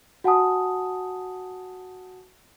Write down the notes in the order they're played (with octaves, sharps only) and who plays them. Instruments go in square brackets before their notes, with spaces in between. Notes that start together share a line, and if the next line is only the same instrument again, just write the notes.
[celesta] F#4 F#5 G#5 A5 D#6